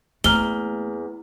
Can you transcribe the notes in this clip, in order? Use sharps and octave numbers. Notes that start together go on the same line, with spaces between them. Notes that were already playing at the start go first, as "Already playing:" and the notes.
E2 A3 A#3 A#5 F6 G7